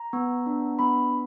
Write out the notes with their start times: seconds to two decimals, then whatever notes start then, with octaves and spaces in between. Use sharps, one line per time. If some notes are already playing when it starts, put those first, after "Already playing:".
Already playing: A#5
0.13 B3
0.46 D4
0.79 B3 B5